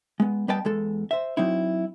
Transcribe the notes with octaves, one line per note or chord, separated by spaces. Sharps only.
G#3 B3
G3 B3 B4 D#5 G5 A5
E2 G#3 A4
C5 E5
F#3 C4 D#4 E4